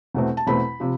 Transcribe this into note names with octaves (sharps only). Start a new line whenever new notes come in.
E2 B2 A3 C4
A5
E2 B2 A3 C4 B5
C3 F3